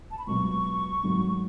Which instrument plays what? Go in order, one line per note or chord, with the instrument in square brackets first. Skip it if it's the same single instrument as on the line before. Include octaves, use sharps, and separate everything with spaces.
[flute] A5
B5
[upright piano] C#2 B2 F#3 [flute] C#6
[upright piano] G#2 D#3 F#3 A3